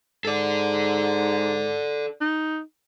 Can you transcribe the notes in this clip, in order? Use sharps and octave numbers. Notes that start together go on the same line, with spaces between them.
G#2 A4 D5
D#4